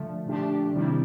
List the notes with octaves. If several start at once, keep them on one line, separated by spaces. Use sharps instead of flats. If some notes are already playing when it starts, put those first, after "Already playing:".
Already playing: D3 F3 A3
A#2 F3 A3 D4 G4
C3 D#3 G3 C4 E4